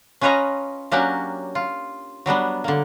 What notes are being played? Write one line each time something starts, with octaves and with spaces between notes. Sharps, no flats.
C#4 F4 B4 C#5 D#5 A#5
F#3 A#3 C#4 D4 F#4 G4
F4
F#3 G3 B3 D4
D3 A#3